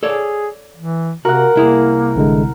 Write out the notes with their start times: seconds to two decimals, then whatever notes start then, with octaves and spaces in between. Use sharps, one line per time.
0.03 G#4 A4 C#5 D5
0.77 E3
1.25 C3 F#4 A#4 F#5
1.56 C2 A#3 E4 G#4
2.16 A1 D3 G#3